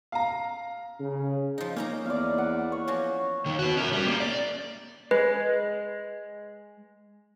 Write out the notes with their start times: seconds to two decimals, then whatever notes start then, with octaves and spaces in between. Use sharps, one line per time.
0.12 F5 A#5
1.00 C#3
1.58 F3 D#4
1.76 A#3 C#4 D#4 A#5
2.06 E2 D5 F5
2.38 F#5
2.72 C#5
2.88 F3 C#4 F#4
3.46 D#2 D#3
3.59 F#4 B4
3.77 C#4 A#4
3.93 G3
4.08 A#3 C#4
4.20 D5
5.11 G#3 B4